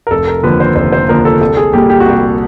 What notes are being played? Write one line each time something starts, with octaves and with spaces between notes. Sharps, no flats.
A#4
F1 A4
A#4
D#2 D3 F3 A#3 B4
C5
F1 C5
C5
D#2 D3 F3 A#3 A#4
A4
C2 A4
G#4
A#2 G3 A#3 G4
G4
F#4
C2 G4